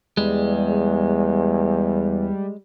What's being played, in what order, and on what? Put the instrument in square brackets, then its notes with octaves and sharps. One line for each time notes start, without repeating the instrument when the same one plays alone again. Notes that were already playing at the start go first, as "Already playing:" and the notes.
[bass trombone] E2 [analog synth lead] G3 [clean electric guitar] G#3